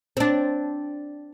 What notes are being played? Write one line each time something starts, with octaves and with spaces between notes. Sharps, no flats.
C4 D4